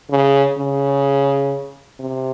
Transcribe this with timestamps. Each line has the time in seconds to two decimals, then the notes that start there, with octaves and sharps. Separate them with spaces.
0.11 C#3
0.58 C#3
2.00 C3